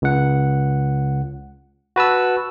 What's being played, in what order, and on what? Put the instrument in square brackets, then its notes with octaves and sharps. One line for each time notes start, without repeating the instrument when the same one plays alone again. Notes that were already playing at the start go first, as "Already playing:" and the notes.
[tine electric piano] C#2 F#5
F#4 B4 A5 E6